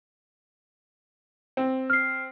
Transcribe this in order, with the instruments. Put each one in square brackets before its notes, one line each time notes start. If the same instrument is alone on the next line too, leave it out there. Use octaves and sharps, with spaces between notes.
[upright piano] C4
[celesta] F6 C7